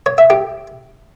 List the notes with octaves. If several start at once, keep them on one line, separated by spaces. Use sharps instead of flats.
C#5
E5
G4